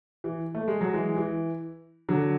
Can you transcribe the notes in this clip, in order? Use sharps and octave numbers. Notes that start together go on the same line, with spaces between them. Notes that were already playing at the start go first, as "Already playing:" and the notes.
E3
A3
G#3
F#3
E3 G#3
E3
D3 F#3